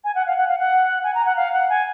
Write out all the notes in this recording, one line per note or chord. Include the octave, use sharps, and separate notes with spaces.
G#5
F#5
F5
F#5
F5
F#5
G#5
A#5
F#5
F5
F#5
G#5